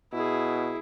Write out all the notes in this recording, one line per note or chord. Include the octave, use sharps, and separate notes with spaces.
B2 E4 G#4